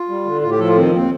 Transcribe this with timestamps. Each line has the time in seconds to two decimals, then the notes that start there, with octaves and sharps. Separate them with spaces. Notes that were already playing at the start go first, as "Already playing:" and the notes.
Already playing: F4
0.09 G3
0.25 D3
0.41 A2 F4
0.51 G4
0.59 F3 A4
0.68 F4
0.76 D#3 C4
0.92 D#2 C4